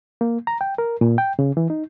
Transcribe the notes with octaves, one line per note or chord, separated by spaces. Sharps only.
A#3
A#5
G5
A#4
A#2
G5
C#3
E3
D#4